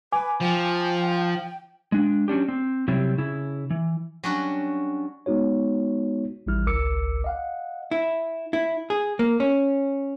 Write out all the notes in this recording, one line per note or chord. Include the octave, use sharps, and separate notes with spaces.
B4 G#5 D6
F3 G5
G#3 D4
F#3 C#4 D4 G4
C4
C3 F#3 G3 C4 E4
C#3 E4
E3
F#3 G3 C#4 D4 F#4
G#3 B3 D#4 F#4 C#5
A1 E3 G3 E4 F6
G#1 C#2 A#4 D6 E6 C#7
D#5 F5 F#5
E4
E4
G#4
A#3
C#4